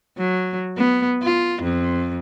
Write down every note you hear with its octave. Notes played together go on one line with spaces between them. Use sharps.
F#3
B3
F4
F2